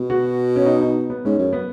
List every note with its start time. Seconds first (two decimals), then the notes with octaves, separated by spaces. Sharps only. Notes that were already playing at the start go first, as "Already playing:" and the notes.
Already playing: B2
0.10 F#4
0.56 C#4
0.66 D#4
0.81 D#4
1.10 B3
1.25 G#2 C#4
1.38 F#2
1.53 B3